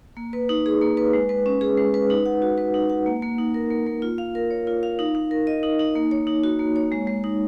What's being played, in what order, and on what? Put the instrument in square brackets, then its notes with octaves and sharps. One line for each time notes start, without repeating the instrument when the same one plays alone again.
[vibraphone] A#3
B4
D#4
G#4
A#3
B4
G#3
B4
C#4
G#4
G#3
B4
D#4
F#5
F#4
B4
D#4
F#5
A#3
A#3
D#4
A#4
A#3
A#3
F4
F5
A#4
C#5
F4
F5
D#4
D#4
A#4
D#5
D#4
D#4
A#3
C#5
D#4
F#4
A#3
C#5
G#3
G#3
D#4